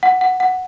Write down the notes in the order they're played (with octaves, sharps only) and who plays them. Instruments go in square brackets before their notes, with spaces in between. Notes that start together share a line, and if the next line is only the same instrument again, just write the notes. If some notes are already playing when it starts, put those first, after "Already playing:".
[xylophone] F#5
F#5
F#5